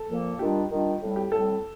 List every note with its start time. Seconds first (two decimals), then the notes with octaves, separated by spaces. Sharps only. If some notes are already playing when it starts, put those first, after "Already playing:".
Already playing: A4
0.09 A#2 F3 A#3
0.39 D#3 G3 D4 F4 G4
0.70 D#3 G3 D4 F4
1.01 A2 G3 C4
1.16 G4
1.32 A2 G3 C4 A4